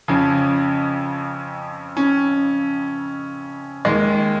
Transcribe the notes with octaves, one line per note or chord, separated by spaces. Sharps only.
F2 C#3 F3 C#4
C#4
D#2 D#3 G#3